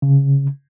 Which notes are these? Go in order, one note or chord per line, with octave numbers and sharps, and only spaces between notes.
C#3